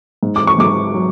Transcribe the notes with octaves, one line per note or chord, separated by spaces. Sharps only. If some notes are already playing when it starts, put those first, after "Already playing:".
G#2
D6
C#6
G#2 D6
F#3